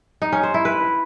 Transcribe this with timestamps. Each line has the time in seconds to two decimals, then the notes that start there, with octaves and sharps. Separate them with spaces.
0.22 D#4
0.32 C#4
0.43 C5
0.54 E4
0.65 B4